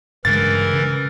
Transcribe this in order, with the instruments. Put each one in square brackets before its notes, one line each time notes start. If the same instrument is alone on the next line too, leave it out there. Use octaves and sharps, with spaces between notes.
[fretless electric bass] G2 C#3 G#3 [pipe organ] E3 A#4 [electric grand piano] A6
[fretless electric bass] C#3